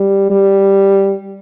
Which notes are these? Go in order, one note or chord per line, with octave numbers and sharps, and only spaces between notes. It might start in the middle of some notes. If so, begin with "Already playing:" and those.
Already playing: G3
G3